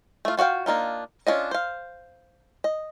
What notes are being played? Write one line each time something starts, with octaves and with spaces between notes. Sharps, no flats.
A3 F4
F4 F#4 D5 F5 G5
A#3 D4 D#4 F4
C#4 D4 F4 D#5
C5 F5
D#5